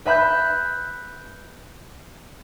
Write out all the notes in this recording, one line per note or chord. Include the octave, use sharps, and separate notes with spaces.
B4 E5 B5 F#6 G6